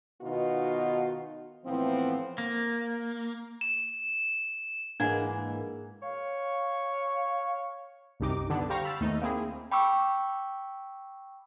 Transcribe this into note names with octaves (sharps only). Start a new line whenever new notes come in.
B2 D#3 B3 D#4 F4 F#4
A2 E3 F3 B3 C4
A#3
E7
G#2 E3 G#3 A#3 D4 F#5 G#5 G#6
C#5 F5
C2 F#2 C3 D#4 D6
D3 B3 D4
G3 C5 F5 G5 A#5 C#6
B5 E6 F6 A6
D#2 A3 D#4
A#3 C4 E4 G#4
G5 B5 C#6 D6 E6